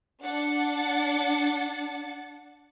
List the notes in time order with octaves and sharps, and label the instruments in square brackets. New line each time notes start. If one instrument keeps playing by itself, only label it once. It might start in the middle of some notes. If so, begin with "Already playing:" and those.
[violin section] D4 F#5 A6 C#7